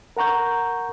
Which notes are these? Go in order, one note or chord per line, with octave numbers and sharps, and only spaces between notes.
A#4 F#5 A#5 C#6 G6